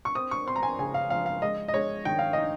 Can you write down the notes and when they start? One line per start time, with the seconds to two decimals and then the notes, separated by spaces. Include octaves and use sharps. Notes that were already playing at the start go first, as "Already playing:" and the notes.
0.05 C#6
0.15 C4 D#6
0.31 C#6
0.47 C4 C6
0.56 A#5
0.63 G#5
0.79 C#3 G#5
0.94 F5
1.10 F3 F5
1.26 F5
1.42 G#3 D#5
1.68 D#5
1.74 G#3 C#5
2.05 D#3 G5
2.19 F5
2.33 D#4 D#5